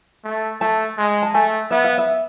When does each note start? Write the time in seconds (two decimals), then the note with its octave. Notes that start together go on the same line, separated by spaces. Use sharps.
0.24 A3
0.61 A3 A5
0.98 G#3
1.22 A5
1.34 A3 G#5
1.71 B3 E5
1.84 F5
1.98 E5